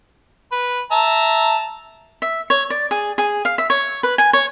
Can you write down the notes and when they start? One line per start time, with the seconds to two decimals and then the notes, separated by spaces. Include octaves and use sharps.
0.52 B4
0.92 E5 A5 A#5
2.22 E5
2.50 C#5
2.70 D5
2.91 G#4
3.18 G#4
3.45 F5
3.58 E5
3.70 C#5
4.03 B4
4.18 G#5
4.33 C#5